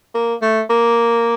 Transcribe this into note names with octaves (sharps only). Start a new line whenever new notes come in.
A#3
A3
A#3